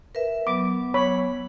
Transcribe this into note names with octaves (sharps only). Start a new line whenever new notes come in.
A#4 B4 E5
F#3 B3 D6
C#5 B5